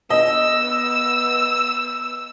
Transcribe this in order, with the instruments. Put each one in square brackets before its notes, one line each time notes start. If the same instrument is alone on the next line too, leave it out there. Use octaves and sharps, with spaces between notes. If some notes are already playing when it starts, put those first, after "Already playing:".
[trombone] B3 [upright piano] D#5 [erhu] E6